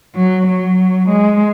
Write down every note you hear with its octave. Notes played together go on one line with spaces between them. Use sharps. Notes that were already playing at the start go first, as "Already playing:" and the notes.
F#3
F#3
G#3